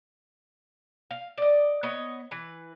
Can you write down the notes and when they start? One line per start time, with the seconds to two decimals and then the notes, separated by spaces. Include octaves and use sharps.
1.11 F5
1.38 D5 D#5
1.83 B3 C#5 D#5
2.31 E3 B4